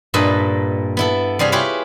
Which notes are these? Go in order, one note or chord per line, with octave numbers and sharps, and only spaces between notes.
G2 A#2 A4 B4 D#5 E5
B3 E4 A4
C3 G3 G#4 F5
E4 F4 G4 G#4 B4 C#5